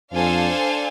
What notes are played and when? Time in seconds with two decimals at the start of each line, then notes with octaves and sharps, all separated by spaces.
0.13 F2 D4 A4 C5 F5 G#5